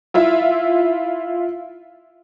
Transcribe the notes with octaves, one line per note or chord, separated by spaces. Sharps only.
E4 F4 E5